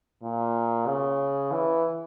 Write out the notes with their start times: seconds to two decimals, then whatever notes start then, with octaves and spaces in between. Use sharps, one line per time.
0.23 A#2
0.87 C#3
1.52 E3